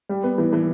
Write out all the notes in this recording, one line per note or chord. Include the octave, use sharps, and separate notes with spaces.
G3
B3
E3
E3